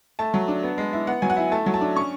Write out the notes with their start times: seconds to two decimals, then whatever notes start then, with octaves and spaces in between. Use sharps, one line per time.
0.19 A3 A5
0.34 F#3
0.48 D4
0.63 B3
0.78 G#3
0.93 E4
1.07 B3 F#5
1.22 F#3 G#5
1.30 F#5
1.37 E4
1.52 A3 A5
1.66 F#3
1.74 A5
1.81 D4
1.96 C#4 C#6